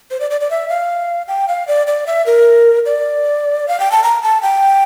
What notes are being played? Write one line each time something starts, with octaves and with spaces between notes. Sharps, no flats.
C5
D5
D5
D5
E5
F5
G5
F5
D5
D5
E5
A#4
D5
F5
G5
A5
A#5
A5
G5